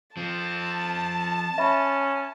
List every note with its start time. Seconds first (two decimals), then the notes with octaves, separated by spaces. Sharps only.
0.17 F3 C4 A5
1.58 C#4 E5 B5